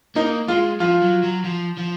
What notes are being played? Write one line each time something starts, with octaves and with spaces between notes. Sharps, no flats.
A#3 D#4
G#3 F4
F3 F4
F#3
F#3
F3
F3